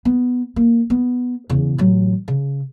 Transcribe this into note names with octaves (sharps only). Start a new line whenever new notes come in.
B3
A#3
B3
E2 C#3
A1 F#3
C#3